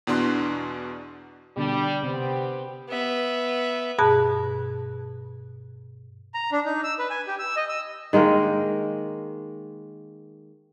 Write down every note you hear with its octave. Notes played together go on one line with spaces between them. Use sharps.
E2 B2 D4 C6 F#6
B2 D3 G3 A5
C3 B3 C4 G4
B3 E5
G2 B2 G#4 A5 F#6
A#5
D4
D#4
E6
B4
G#5
G4
E6
D#5
E6
D#3 G#3 A#3 A#4